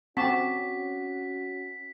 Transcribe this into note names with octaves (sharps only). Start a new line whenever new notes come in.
C4 C#4 F#4 F#5 A5 C#6 D6 B6